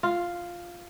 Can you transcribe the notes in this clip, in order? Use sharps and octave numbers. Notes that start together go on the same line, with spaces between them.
F4